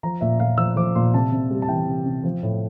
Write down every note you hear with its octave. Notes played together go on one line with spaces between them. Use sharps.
F3 A#5
A#2 E5
A#2 F5
F3 E6
F3 D6
A#2 C6
C3 A5
C3
G3
A5
E3 G5
C3
C3
F3
A2